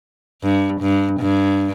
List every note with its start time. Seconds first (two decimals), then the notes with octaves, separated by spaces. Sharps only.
0.42 G2
0.81 G2
1.20 G2